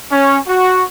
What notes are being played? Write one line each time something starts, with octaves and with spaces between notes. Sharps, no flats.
C#4
F#4